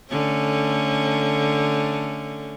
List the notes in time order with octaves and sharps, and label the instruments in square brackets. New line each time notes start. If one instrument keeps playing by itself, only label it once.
[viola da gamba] D3 A3 C#4